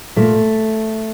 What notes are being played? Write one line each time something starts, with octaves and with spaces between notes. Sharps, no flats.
A#2 A3